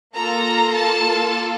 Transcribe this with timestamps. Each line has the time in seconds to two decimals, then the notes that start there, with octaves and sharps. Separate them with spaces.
0.14 A#3 F4 A4 A#5
0.73 A5